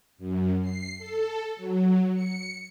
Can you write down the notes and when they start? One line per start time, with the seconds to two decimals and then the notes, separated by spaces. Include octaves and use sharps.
0.18 F#2
0.61 C7
0.98 A4
1.56 F#3
2.14 C#7